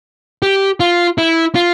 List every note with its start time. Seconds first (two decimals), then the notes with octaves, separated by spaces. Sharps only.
0.42 G4
0.80 F4
1.18 E4
1.55 F4